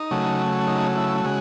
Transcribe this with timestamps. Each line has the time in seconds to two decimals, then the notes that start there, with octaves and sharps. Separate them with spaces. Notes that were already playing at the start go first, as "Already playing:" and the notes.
Already playing: D#4
0.11 C#3 F#3 A3
0.67 D#4
0.96 E4
1.25 C#3 G#3 F#4